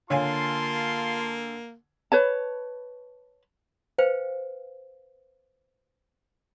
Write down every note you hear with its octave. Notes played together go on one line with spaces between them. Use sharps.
D3 A#3 F4 C#5 F5 G#5 A5 C6
B4 C#5 A5
B4 C5 F5 G5